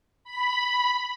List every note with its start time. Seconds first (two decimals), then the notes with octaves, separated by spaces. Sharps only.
0.24 B5